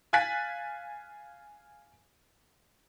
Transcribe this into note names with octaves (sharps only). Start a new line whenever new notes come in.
F5 G#5 F#6 A6 B6